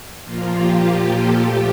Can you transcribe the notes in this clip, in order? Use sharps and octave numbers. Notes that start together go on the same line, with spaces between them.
A#2 F3 A#3 F4
G4
G4
A4
A#2 F3 A3 G4